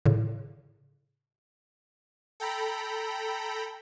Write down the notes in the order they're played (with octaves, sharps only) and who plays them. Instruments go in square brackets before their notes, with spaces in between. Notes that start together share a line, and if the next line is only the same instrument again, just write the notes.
[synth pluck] A2 C#3
[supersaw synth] A4 G5 A#5 B5